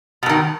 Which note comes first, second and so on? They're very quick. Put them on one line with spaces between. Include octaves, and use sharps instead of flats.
B2 G2 D#3